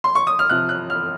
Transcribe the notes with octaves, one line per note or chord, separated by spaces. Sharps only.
C6
C#6
D#6
F6
C3 F3 F#6
F#6
F6